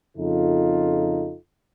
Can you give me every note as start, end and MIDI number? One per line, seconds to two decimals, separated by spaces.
0.17 1.36 41
0.17 1.36 49
0.17 1.36 63
0.17 1.36 65
0.17 1.36 69